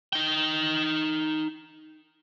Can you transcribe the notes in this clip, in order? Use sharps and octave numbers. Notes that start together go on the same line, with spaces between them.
D#4 G5